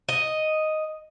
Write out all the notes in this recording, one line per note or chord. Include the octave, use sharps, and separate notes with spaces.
D#5